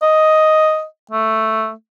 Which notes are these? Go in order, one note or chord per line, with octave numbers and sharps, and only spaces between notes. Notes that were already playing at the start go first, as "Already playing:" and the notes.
D#5
A3